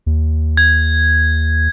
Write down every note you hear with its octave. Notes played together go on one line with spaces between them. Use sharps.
D#2
G#6